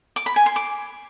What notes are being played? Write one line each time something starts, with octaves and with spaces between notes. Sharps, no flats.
D6
B5
G#5
C6
D6